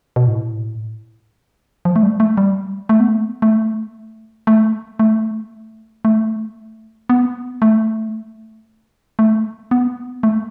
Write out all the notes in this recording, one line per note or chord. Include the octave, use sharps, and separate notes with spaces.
B2
A2
F3
A3
G3
A3
G3
A3
B3
A3
A3
A3
A3
A3
B3
A3
A3
B3
A3